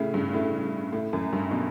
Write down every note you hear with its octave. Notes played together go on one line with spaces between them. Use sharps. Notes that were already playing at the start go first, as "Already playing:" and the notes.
Already playing: A2 C#3
G2
A2
A2
F#2
G2
B2